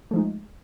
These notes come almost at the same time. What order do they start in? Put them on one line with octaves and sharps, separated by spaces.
A3 F3 D#4 G#3